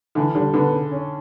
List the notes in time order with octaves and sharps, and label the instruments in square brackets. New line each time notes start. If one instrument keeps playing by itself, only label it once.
[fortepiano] D3 [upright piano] E3
[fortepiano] D3 [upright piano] G3
[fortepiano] D3 [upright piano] B3
[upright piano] C#3
C#4